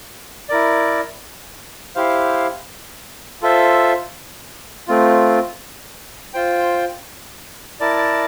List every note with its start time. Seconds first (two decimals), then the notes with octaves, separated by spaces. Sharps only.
0.49 E4 A#4 D5
1.96 E4 G4 C5 F5
3.42 F4 A4 C5 E5
4.88 A3 C4 F4
6.34 F4 C5 G5
7.80 E4 A#4 D5 A5